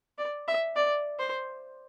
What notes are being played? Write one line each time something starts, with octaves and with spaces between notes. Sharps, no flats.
D5
E5
D5
C5